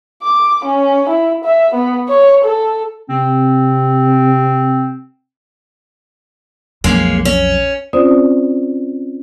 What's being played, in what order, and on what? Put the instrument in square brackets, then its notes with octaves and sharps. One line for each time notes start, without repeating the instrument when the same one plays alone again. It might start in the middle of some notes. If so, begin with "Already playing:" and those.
[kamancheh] D6
C#4
E4
E5
B3
C#5
A4
[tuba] C3 [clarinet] C4
[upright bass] B1 F2 [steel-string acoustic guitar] G#3 A#3 C#4
[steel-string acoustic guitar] C#4
[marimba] C4 C#4 F4 C5 D5 D#6